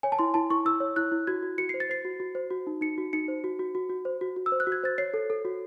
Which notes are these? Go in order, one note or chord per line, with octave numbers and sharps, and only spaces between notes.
C#5 G#5
A5
E4 C6
E4 A5
E4 C#6
E4 E6
C#5
E4 F#6
E4
F#4 G#6
F#4
F#4 C#7
C5 C7
A6
C5 C7
F#4
F#4
C5
F#4
D#4
D#4 C#7
F#4
D#4 C#7
C5
F#4
F#4
F#4
F#4
C5
F#4
F#4
E6
C5
F#6
F#4
G#6
C5 A6
C#5 C7
A4
A4
F#4